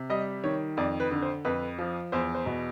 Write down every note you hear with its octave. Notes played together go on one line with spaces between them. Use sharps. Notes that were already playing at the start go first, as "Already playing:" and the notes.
Already playing: C3
G3 D#5
D#3 C#5
F2 D5
B4
D3
C5
F2 B4
F3
E2 C5
C5
B2